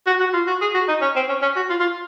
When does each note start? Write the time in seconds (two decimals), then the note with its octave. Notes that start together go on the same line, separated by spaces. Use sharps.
0.07 F#4
0.20 F#4
0.34 F4
0.47 F#4
0.61 G#4
0.75 F#4
0.88 D#4
1.01 C#4
1.16 C4
1.29 C#4
1.42 C#4
1.56 F#4
1.70 F4
1.80 F4